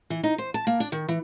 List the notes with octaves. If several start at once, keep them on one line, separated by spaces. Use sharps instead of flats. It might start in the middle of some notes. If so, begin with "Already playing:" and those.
E3
D#4
C5
A5
A#3
D4
D#3
E3